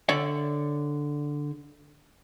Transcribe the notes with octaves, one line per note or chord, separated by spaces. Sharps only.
D3 C#5 D5 E5